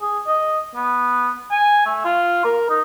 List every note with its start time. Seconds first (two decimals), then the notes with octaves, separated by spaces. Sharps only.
0.01 G#4
0.27 D#5
0.75 B3
1.51 G#5
1.86 A3
2.04 F4
2.44 A#4
2.69 D#4